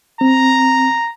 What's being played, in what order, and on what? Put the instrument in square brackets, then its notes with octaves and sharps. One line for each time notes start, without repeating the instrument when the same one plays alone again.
[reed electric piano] C4 [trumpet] A#5